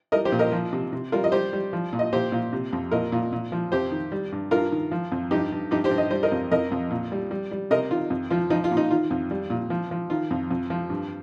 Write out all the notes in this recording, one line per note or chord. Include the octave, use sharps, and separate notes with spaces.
G3 A#4 D#5
G4 C5
A#2
A#4 D#5
F3
C3
C3
G3 F4 A#4
D#5
G3 G4 C5
G3
F3
A#2
D#5
A#2 G4 C5
A#2
C3
F2
A#2 A#4 D#5
A#2
A#2
F3
F2 G4 C5
D#3
G3
G2
G2 F4 A#4
D#3
F3
F2
G2 D#4 G4
G2
G2 D#4 G4
G4 C5
G2
D#5
G3 C5
A#4 D#5
F2
F2 A#4 D#5
F2
A#2
G3
G3
G3
C3 A#4 D#5
D#3 F4
F2
F3 F4
F3 D#4
F4
A#2
D#4
D#3 F4
F2
G3
A#2
F3
F3
D#3 F4
F2
F2
F3
G2